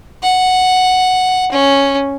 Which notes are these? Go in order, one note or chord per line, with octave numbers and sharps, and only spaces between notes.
F#5
C#4